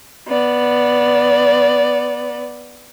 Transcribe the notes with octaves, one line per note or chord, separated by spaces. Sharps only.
B3 D5